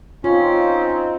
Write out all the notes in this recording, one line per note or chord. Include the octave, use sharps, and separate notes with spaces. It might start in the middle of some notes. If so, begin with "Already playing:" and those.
C4 C#4 D#4 F4